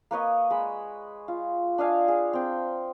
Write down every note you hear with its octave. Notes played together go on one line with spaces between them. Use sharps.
A#3 B4 C#5 D#5
G#3 B5
F4
D4 D#5 F5 G#5
G#4
C4 G5